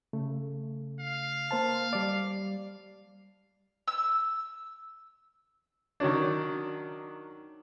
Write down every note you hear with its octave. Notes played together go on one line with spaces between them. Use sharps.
C#3 A3
F5
A#3 C5 A5
G3 D5
E6
D#3 F#3 C#4 D4